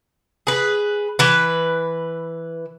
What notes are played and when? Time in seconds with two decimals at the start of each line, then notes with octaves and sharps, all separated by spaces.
0.47 G#4 B4
1.19 E3 B4